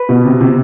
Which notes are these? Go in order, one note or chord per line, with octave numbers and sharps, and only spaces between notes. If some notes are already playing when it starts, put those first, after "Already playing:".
Already playing: B4
B2
C3
C3